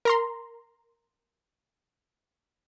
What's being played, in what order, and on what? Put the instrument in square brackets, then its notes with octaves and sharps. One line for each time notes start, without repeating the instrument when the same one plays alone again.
[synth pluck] A#4 A#5 C6